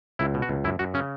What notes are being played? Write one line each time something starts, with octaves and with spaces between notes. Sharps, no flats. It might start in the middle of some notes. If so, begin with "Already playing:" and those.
C#2 E4
B2
F#4
C#2
F#2 E4
F#2 F#4
C#3 C#4